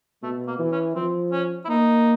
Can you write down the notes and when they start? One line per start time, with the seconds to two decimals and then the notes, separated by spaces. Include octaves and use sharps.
0.23 B2 A3
0.47 A#3
0.59 E3
0.72 C#4
0.95 F3 C4
1.32 C#4
1.65 E4
1.69 A#3 D#4